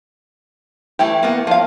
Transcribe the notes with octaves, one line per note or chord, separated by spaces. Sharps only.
E3 A3 E4 G4
A#3 B3
F3 F5